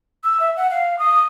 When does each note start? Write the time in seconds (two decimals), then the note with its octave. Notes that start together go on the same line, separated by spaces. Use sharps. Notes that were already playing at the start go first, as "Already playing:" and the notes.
0.24 E6
0.40 E5
0.57 F#5
0.70 F5
0.99 D#6